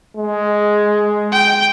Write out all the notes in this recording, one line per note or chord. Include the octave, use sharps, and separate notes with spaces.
G#3
G5